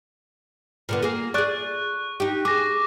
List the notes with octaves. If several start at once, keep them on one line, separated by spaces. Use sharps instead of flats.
A#2 D3 B3
A#3 G#4
G#4 D5 C#6 F#6
D#4 G4
G#4 D6 A#6